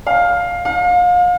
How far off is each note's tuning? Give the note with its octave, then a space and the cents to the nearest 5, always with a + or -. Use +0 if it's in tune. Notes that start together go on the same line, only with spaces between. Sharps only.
F5 +10
F5 +35